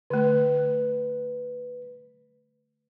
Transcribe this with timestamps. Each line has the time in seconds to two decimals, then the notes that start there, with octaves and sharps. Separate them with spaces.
0.10 D3 A3 B4